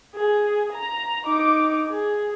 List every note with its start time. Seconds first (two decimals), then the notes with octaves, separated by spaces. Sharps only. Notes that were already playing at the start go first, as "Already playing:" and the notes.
0.16 G#4
0.73 A#5
1.25 D#4 D6
1.90 G#4